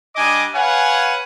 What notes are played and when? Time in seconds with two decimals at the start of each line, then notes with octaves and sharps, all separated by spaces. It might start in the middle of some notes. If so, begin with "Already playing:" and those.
0.16 G3 D4 D#5 G#5 D6 D#6
0.54 B4 C#5 F5 F#5 G#5